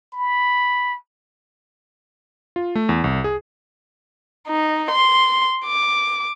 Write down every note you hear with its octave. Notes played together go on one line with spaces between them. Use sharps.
B5
F4
A3
E2
C2
G#4
D#4
C6
D6